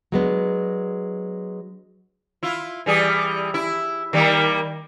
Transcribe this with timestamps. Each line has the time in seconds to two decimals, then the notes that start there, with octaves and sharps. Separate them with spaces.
0.12 F#3 G#3 B3 D4
2.43 E4 F4
2.86 E3 G3 G#4
3.54 E4
4.13 D#3 G3 A#3